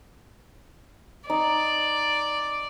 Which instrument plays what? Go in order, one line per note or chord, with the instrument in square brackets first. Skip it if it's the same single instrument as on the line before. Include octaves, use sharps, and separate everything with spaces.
[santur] D#4 [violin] D5